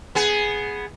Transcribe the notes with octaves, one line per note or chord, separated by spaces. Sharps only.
B3 G#4